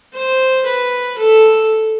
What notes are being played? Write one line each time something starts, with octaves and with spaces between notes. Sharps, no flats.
C5
B4
A4